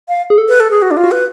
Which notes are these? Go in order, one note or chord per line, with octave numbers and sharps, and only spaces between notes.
F5
G#4
A4
B4
A4
G#4
F#4
D4
F4
F#4
B4